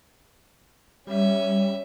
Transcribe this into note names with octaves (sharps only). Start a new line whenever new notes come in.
G3 C#4 E5